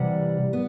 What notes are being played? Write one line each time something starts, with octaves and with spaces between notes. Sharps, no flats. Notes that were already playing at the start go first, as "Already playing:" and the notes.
Already playing: C3 E3 G3 F#5
B3